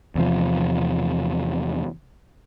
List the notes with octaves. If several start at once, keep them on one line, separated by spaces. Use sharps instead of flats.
E2 C3 F3